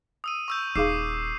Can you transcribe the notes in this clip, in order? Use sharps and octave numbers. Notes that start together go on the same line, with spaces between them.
D#6 E6 D#7
C#6 E6 G6
D#1 D#4 G#4 F5 D6 E6 C7